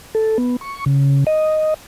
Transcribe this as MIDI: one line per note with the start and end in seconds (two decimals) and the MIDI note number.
0.15 0.38 69
0.38 0.56 59
0.61 0.84 85
0.86 1.24 49
1.27 1.74 75